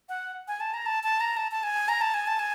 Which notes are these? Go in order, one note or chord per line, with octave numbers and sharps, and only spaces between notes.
F#5
G#5
A5
A#5
A5
A5
A#5
A5
A5
G#5
A#5
A5
G#5
A5
G#5